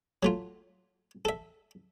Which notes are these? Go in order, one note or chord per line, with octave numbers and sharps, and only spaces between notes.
F#3 A3 F4
A4 E5